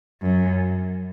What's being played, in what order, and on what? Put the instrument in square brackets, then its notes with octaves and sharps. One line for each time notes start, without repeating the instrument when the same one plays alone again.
[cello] F#2